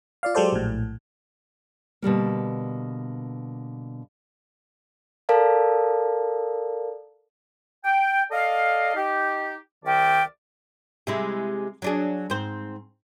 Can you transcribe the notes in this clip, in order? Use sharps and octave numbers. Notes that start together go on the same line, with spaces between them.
F4 D5 F5
F#3 G#3 G4 A4 C5 D5
A#1 A2
B2 D3 G3 A#3
A4 A#4 D5 F5 A5
G5
A4 D5 D#5 F5
D#4 G4
C2 D#3 D5 E5 G5
C3 G#3 E4
F#3 D4 G#4
G#2 C4 C5